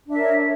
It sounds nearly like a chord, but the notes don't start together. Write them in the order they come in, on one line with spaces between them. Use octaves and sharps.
D4 E5 A#4 C#5